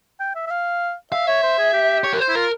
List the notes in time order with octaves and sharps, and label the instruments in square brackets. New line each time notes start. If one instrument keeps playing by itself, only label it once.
[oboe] G5
E5
E5
F5
[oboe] E5 [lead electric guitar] F5
[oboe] C#5 [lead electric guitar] E5
[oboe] C5
G#4
G4
[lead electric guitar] C#5
A#4
C5
[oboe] E4
[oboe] F4 [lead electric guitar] A#4